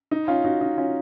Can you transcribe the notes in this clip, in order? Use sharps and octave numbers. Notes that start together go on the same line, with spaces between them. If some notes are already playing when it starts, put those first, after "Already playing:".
D#4
C#4 F4
D#4 F#4
D#4
C#4 F4